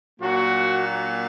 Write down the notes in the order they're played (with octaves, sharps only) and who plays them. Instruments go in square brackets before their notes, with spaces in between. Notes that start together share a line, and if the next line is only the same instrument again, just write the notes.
[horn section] A#2 F#3 A#3 D4 F#4